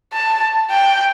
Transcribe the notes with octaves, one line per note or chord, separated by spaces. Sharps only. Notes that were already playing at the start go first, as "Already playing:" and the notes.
A5
G5